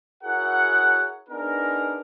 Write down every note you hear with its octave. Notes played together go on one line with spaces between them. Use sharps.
E4 F#4 G#4 A#4 C#5 F#5
B3 D4 D#4 G#4 A#4